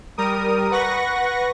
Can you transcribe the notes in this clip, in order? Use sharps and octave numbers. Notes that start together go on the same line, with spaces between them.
G3 A#4 D#6
B4 F#5 C#6 A#6